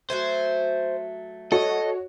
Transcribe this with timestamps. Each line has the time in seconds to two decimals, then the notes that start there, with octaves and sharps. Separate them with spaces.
0.10 F#3 A3 C5 G#5
1.52 F#4 A4 C#5 D#5